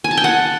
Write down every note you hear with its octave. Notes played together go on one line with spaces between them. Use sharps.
G#5
A5
G5
F#5